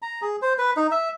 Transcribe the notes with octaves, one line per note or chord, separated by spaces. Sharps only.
A#5
G#4
C5
B4
D#4
E5